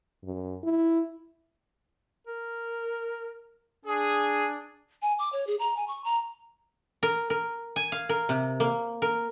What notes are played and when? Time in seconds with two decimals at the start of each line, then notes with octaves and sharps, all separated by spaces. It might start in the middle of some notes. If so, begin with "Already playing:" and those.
0.23 F#2
0.63 E4
2.27 A#4
3.85 D4 G#4
5.02 G#5
5.19 D6
5.32 C#5
5.47 G#4
5.59 A#5
5.77 G#5
5.88 C#6
6.04 A#5
7.03 A#4
7.30 A#4
7.76 G#5
7.92 F5
8.09 A#4
8.29 C3
8.60 A#3
9.02 A#4